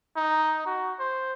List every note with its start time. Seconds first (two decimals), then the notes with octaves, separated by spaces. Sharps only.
0.16 D#4
0.66 F#4
1.00 C5